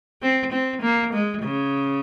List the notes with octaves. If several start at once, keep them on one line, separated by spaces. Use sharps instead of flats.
C4
C4
A#3
G#3
C#3